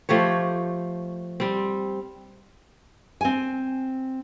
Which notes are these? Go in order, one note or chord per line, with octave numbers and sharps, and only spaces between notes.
F3 A3 G4 C#5
G3 C4
C4 G#5